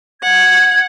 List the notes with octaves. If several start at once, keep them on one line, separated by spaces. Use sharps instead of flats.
F#5 G#6